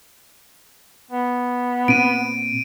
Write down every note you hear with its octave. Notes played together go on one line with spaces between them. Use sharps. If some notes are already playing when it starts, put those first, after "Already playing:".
B3
A#2 C4 D7 D#7